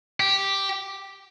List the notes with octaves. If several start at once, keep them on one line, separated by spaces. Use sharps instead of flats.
G4